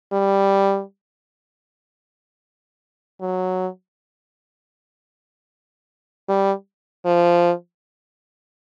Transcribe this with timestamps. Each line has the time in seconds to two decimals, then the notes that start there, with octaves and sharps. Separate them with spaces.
0.12 G3
3.21 F#3
6.29 G3
7.05 F3